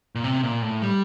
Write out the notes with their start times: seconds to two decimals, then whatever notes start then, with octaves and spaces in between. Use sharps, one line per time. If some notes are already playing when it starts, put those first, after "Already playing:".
0.15 A#2
0.24 C3
0.43 A#2
0.62 A2
0.82 G3